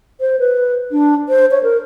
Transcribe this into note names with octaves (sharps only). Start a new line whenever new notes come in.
C5
B4
D4
C5
C#5
A#4